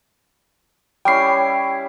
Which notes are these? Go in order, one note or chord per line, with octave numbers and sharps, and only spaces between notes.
G3 C#4 E4 G5 C7